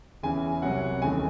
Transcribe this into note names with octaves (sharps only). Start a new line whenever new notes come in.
E2 C#3 E3 G#5
C2 C3 F#3 F#5
D#2 C#3 E3 A3 G#5